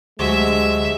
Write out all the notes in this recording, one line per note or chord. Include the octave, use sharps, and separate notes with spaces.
D2 C3 F#3 G#3 E5